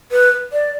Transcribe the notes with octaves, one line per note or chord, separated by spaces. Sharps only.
B4
D5